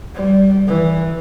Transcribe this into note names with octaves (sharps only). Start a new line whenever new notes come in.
G3
E3